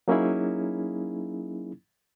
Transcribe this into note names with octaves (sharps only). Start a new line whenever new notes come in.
F#3 A#3 C#4 D#4 E4 G#4